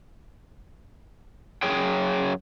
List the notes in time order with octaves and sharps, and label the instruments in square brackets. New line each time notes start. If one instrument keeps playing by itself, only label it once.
[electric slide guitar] F#2 G#4 C#5 G5